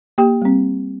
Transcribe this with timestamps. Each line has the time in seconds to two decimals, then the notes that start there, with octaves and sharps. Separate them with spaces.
0.18 A#3 G4 G5
0.42 G3 C4